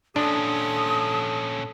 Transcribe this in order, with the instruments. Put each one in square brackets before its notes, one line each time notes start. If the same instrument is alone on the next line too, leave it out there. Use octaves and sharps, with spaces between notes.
[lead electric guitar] A#2 C#4 [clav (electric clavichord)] D4 [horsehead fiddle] A4 [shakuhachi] D#6